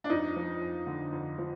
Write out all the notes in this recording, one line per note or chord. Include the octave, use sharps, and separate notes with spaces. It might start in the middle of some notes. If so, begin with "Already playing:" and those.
D4
F2 D#4
F3
F2
D3
F2
F3